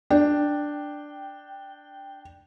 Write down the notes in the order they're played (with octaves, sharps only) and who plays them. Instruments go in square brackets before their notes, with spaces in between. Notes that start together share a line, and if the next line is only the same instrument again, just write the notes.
[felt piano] D4 [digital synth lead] G5